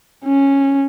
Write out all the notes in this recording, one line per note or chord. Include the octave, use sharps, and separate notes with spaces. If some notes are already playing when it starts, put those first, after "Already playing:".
C#4